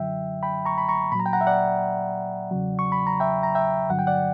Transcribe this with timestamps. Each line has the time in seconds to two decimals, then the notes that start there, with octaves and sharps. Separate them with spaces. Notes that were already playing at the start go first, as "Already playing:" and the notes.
Already playing: F#2 D3 F#3 E5 G5
0.43 G5 B5
0.65 A#5 C#6
0.78 B5
0.88 A#5 C#6
1.12 A#2 B5
1.15 F#3 A#5
1.26 G5
1.33 F#5 A#5
1.41 E5
1.47 D5 F#5
2.51 E2 C#3 F#3
2.79 C#6
2.92 B5
3.07 A#5
3.20 E5 G5
3.43 A#5
3.55 E5 G5
3.89 G2 D3 F#3 F#5
3.99 G5
4.07 D5 F#5